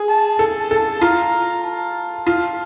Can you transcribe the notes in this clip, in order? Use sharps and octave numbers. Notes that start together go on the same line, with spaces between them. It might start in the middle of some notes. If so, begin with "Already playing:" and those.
Already playing: G#4
A5
A4 A5
A4
F4 A#5
A5
F4